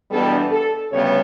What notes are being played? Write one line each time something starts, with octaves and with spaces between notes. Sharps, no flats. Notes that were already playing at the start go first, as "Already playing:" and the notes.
E2 B2 G3 B3 D4 A4
A4
D2 C#3 G3 B3 C#5